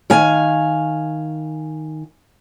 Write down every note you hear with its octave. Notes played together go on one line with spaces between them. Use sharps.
D#3 F5 G#5